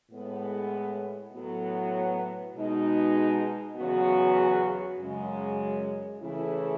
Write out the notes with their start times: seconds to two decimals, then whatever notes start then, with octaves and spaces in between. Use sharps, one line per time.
0.10 A2 G#3 B3
1.33 A2 F#3 B3
2.54 B2 G#3 D#4
3.76 E2 C#3 F#3 B3 F#4
4.99 F#2 C#3 G#3
6.20 C#3 E3 A3 E4